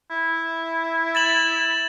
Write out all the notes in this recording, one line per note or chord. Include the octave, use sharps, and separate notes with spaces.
E4
A6 E7 F#7